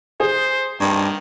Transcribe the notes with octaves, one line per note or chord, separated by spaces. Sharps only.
G#4 C5
G2 D#3